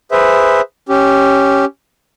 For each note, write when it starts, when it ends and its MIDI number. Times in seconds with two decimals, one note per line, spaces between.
0.11 0.61 68
0.11 0.61 71
0.11 0.61 72
0.11 0.61 76
0.89 1.65 61
0.89 1.65 67